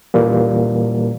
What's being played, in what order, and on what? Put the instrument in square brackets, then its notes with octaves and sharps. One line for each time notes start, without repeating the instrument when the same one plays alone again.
[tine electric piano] A#2 E3 G3 A#3